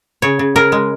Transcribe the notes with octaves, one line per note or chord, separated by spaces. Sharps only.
C#3 C#5
C#3
C#3 A#4
G#3